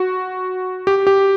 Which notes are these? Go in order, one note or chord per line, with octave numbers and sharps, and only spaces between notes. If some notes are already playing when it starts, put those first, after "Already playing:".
Already playing: F#4
G4
G4